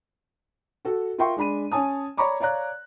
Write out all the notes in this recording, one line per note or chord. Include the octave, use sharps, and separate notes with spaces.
F#4 A4
F4 A#4 E5 G5 C6 C#6
G#3 D4 B5 D#7
C#4 C#5 G#5 A5 D#6
C#5 D5 A#5 B5 C#6 D6
C#5 D5 F5 A#5 F#6